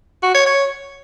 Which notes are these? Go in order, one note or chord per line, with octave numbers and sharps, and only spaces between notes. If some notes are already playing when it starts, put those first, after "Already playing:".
F#4
C#5
C#5